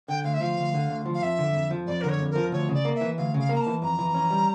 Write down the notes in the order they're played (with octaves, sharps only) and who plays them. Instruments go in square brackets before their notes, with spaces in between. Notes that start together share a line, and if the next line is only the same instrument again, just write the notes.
[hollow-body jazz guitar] D3 [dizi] G5
[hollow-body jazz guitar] D2 [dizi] F5
[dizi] E5
[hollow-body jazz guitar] F3 [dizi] F5
[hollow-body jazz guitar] D2
D3
D2
F3
[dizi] F5
[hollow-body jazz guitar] F2 [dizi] E5
[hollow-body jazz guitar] D3
F2
F3
[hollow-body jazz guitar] F2 [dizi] D5
[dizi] A#4
[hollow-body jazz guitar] D3
[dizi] C#5
[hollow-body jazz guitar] F2
[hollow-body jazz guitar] F3 [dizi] A#4
[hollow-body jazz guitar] D2 [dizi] C#5
[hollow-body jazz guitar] C#3
[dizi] D5
[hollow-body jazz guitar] A#3
[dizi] E5
[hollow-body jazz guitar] E3
[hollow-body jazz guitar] D2 [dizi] F5
[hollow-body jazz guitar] C#3
[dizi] F5
[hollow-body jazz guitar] A#3
[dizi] A#5
A5
[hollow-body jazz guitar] E3
[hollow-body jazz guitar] F2 [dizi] A#5
[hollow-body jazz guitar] E3
C#4
G3